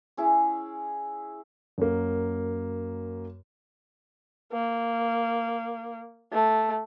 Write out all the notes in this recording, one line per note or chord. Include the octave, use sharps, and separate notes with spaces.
C#4 E4 G#4
F#2 A#3
A#3
A3